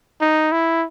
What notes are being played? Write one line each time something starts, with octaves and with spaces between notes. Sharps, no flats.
D#4
E4